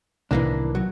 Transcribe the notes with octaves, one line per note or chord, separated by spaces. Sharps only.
C2 A2 D#3 E3 A#3 D4
F#3